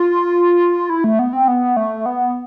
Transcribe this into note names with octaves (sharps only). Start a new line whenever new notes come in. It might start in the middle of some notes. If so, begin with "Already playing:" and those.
Already playing: F4
E4
A3
B3
C4
B3
A3
B3